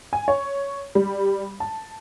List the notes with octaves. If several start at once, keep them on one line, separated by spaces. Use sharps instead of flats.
G#5
C#5
G3
A5